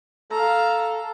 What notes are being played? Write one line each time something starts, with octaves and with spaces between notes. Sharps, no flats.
A4 F5 A#5